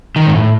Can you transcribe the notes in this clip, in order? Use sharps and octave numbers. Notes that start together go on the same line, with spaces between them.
D#3
G#2
A2